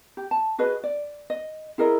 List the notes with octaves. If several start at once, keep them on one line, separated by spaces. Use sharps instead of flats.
G4
A5
F#4 G#4 B4 D#5
D5
D#5
E4 G#4 A#4 D#5